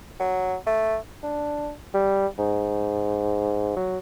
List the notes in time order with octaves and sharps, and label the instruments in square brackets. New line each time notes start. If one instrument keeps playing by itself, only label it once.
[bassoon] F#3
A3
D4
G3
G#2
F#3